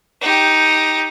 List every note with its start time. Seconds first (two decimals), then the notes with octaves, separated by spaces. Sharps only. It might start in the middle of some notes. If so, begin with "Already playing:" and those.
0.21 D#4 G4